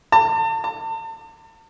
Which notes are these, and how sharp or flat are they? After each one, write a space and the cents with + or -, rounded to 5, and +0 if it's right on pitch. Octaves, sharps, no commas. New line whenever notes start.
A5 +40
A5 +40